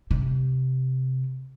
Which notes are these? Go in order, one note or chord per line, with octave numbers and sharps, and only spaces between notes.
C3